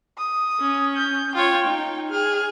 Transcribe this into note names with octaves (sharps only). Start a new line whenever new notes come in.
D#6
C#4
G6
F4 C#5 G5
D#4
G#4 F6